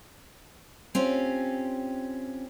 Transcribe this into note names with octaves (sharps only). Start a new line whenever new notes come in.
C4 C#4 F4 G4